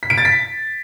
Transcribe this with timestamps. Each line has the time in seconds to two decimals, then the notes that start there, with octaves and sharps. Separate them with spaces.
0.03 B6
0.10 D7
0.18 A6
0.25 B6